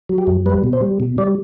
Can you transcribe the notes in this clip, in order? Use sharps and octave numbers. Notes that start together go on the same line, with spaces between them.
F#3
G4
F#2
G3 B4
B2
C5
G3
B2
G3 D5